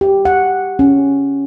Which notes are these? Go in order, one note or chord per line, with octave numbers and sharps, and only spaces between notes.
G4
F#5
C#4